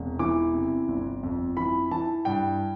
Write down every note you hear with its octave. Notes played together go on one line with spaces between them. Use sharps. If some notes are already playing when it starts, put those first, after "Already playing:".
Already playing: E1 C3
E3 D6
C3
G1
F2
E3 B5
E3 A5
G2 G5